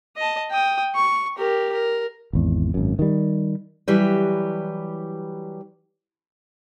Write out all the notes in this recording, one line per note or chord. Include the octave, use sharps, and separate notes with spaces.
D#5 A5
G5 D#6
C#6
G4 A#4
A#4
G#1 E2
G#1 F#2
D#3 G3
E3 F#3 G3 G4 B4